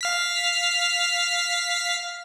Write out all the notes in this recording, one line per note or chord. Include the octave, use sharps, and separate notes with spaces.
F5 F6 B6